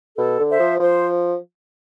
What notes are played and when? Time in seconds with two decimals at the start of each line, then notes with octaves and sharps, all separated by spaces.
0.18 B2 A4
0.39 D3
0.50 C5 E5
0.59 F3
0.80 F3 C5